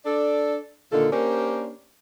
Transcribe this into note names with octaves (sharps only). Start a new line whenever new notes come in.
D4 A4 D5
A#2 D3 D#3 F4 A4
A#3 C#4 D4 G4 A#4 C5